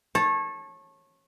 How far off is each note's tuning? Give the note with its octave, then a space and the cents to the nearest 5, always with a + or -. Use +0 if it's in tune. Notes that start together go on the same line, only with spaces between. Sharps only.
C#5 -25 A5 +0